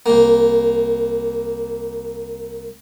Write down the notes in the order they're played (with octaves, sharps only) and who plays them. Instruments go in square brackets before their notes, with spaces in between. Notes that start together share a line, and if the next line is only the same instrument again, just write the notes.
[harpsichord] C2 A#3